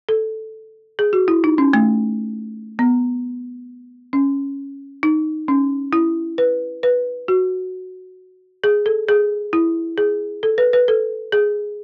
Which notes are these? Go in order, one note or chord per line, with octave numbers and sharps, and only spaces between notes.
A4
G#4
F#4
E4
D#4
C#4
A3
B3
C#4
D#4
C#4
E4
B4
B4
F#4
G#4
A4
G#4
E4
G#4
A4
B4
B4
A4
G#4